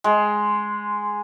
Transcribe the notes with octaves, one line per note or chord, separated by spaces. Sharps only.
G#3